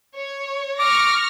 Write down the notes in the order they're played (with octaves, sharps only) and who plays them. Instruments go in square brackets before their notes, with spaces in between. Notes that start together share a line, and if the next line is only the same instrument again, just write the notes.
[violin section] C#5
[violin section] C#6 F6 A#6 [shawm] D6